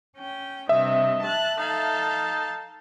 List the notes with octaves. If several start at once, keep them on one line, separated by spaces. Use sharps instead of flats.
C#4 G5
G2 C3 D#5 E5
A5 F#6
D#4 A4 F5 A5